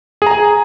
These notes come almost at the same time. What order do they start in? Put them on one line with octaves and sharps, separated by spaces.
G#4 A#5 G#5